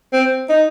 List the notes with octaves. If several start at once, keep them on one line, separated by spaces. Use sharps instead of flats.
C4
D#4